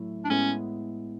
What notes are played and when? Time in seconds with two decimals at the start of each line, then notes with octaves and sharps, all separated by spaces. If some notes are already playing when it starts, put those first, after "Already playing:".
Already playing: A2 F#3 A3 E4
0.25 D4
0.30 A2 G#3 B3 C#4 E4